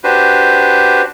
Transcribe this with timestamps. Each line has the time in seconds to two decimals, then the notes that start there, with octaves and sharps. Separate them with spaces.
0.04 D4 F#4 G4 B4 C5